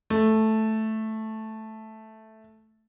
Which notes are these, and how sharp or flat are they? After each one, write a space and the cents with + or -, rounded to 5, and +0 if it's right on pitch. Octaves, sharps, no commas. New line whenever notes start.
A3 -5